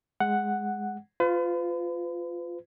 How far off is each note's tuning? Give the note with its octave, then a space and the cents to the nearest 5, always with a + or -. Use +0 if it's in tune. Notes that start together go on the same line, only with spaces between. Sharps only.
G#3 +0 F#5 +0
F4 +0 B4 +40